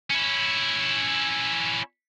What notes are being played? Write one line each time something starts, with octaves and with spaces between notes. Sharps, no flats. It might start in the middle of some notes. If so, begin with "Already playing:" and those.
C#4 E4